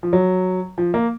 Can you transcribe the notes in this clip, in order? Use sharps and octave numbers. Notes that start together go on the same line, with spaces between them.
F3
F#3
F3
A#3